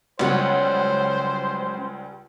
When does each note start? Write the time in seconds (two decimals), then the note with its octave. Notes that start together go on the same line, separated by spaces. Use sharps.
0.19 C#2 F#3 G3 C#4 C5 F#5